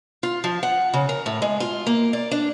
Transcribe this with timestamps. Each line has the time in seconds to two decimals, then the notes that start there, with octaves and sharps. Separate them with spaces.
0.23 F4
0.44 F3
0.63 F#5
0.94 C#3
1.09 A#4
1.26 A2
1.42 G#3
1.60 F4
1.87 A#3
2.13 D5
2.31 D4